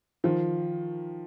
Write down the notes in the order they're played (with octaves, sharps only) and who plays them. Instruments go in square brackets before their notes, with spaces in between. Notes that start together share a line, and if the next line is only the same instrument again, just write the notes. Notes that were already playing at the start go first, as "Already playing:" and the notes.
[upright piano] D#3 F3